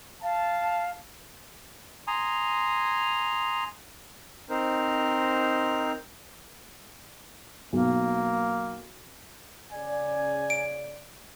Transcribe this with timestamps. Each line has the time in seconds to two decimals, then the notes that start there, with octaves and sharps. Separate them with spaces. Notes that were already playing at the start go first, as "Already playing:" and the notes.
0.23 F5 A5
2.07 G#5 A#5 C6 D#6
4.50 C4 D#4 A#4 C5
7.73 B1 A#3
9.73 C#3 D5 G#5
10.50 D7